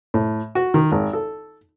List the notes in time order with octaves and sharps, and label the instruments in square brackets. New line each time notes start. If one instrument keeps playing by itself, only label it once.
[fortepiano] A2
F#4
D#3
G#1
A4